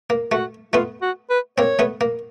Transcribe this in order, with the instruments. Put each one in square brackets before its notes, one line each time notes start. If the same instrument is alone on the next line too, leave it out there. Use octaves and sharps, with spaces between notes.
[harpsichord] A#3
[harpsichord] A3 [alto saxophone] F#4
[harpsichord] A3 B3 [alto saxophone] F4
[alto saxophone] F#4
B4
[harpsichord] A#3 C4 [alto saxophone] C#5
[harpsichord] A3 B3
A#3